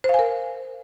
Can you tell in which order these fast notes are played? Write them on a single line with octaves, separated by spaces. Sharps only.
C5 F5 G#5 A#4